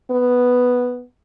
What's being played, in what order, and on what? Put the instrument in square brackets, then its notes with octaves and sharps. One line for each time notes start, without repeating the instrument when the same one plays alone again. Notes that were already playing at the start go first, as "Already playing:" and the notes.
[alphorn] B3